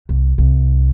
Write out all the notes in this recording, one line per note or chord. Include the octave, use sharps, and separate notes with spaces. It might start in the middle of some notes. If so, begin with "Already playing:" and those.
C2
C2